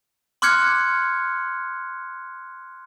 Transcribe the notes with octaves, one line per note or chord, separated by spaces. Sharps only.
C6 D6 F6 F#6 G#6 C#7